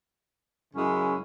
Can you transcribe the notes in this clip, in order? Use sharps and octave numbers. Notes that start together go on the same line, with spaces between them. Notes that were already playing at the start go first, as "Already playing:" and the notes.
F#2 C#3 G#3 C#4 E4